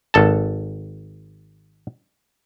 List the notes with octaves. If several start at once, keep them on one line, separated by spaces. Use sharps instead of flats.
G#1 A4 A5